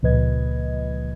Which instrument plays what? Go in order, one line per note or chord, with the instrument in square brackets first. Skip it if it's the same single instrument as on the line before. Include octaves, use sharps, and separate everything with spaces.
[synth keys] C#2 A#2 F3 B4 D#5 G#6